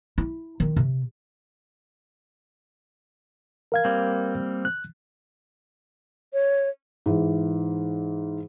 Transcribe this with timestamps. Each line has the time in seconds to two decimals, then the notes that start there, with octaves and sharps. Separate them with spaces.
0.18 E4
0.60 D#3
0.76 C3
3.72 A#4 F5 G#6
3.85 G3 A#3 C4
4.65 F#6
6.33 C#5
7.06 G#2 E3